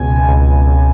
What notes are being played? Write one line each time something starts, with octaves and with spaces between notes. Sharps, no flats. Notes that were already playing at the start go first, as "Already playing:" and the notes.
Already playing: C#2 B2 G#5
C#2
C#2